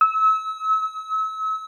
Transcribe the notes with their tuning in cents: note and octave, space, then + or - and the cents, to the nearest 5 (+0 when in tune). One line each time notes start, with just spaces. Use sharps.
E6 -35